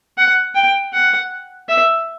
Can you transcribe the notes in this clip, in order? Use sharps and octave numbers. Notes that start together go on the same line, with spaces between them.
F#5
G5
F#5
E5